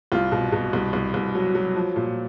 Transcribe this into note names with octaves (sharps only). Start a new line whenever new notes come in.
C2 F4
B2
B2
C2
C2
C2
F#3
F#3
F3
A#2